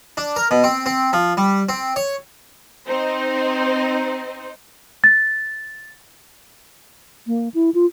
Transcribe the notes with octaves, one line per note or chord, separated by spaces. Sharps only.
D4
A#4
B2
C4
C4
F3
G3
C4
C#5
C4 D#4 C5
A6
A#3
E4
F4